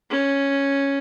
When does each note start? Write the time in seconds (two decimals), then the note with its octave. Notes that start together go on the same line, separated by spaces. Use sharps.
0.10 C#4